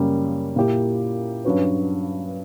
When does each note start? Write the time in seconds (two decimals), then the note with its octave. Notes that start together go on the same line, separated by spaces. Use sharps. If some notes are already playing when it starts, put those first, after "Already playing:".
Already playing: F#2 C#3 G3 A#3 C#4
0.56 A#2 A#3 E4 G4
1.45 G2 F#3 C#4 F#4 B4